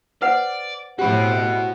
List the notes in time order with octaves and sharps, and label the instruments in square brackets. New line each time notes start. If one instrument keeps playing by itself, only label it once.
[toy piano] B4 C5 F#5 [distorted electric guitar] D5
[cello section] A2 C4 [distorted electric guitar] F#4 B5 [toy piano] G4 [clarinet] F#5